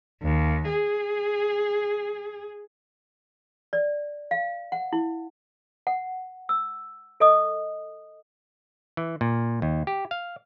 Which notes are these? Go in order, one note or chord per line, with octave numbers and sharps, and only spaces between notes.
D#2
G#4
D5
F5
F#5
E4
F#5
E6
A4 D#5 D#6
E3
A#2
D#2
G4
F5